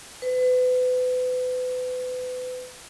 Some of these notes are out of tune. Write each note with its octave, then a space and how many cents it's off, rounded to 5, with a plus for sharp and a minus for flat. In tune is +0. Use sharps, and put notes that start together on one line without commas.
B4 +35